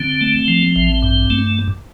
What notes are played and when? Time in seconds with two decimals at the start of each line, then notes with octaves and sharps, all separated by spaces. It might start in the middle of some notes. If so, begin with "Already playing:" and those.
Already playing: D3 C4
0.21 A3
0.48 F3
0.76 A1
1.02 G2
1.30 A3